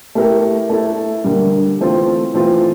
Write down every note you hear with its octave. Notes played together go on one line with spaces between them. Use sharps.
A3 E4 G4 A#4
A3 E4 A4
D3 G3 A#3
E3 A3 C4 F4
E3 A3 C4 F4